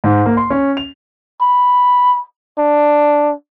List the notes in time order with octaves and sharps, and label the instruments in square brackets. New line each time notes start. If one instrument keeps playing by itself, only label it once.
[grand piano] G#2
A#3
C6
C#4
F7
[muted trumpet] B5
D4